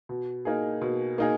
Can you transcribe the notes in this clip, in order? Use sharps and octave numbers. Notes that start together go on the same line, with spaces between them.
B2
A#3 D#4 G#4
B2
A#3 D#4 G#4